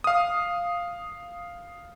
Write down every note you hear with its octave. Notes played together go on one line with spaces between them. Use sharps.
F5 D#6